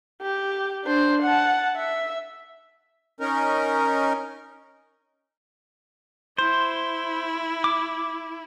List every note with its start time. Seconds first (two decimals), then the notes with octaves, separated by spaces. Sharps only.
0.21 G4
0.84 D4 C5
1.23 F#5 A5
1.76 E5
3.20 C#4 D#4 A#4
6.38 E4 C5
7.64 D6